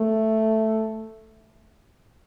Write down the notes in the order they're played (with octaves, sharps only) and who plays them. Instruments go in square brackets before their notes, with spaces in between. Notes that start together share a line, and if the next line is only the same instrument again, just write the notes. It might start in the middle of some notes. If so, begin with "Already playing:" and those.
Already playing: [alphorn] A3